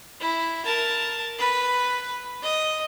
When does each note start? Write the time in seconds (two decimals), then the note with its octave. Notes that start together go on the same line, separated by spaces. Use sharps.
0.20 E4
0.65 A#4 A5
1.39 B4
2.43 D#5